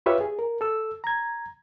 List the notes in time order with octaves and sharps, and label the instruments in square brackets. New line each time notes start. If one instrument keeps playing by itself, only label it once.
[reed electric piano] F4 G4 B4 C#5 E5 F5
G#4
A#4
A4 E6
A#5 G#6